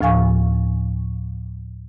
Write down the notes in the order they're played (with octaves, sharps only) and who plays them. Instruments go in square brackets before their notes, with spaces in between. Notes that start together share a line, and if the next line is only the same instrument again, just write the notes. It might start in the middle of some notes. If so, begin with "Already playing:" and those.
[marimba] D2 A2 F3 F5 G#5 C#6